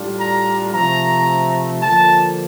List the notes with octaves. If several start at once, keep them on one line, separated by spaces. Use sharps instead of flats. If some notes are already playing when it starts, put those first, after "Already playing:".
Already playing: A2 G3 D4 F4
A#5
C3 F3 A3 A#5
D3 F3 A#3 F4 A5